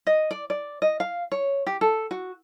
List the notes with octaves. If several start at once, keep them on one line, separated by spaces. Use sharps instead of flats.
D#5
D5
D5
D#5
F5
C#5
G4
A4
F#4